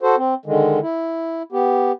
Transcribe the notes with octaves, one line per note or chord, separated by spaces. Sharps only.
F#4 A4 C5
C4
D3 D#3 G#3
E4
B3 G4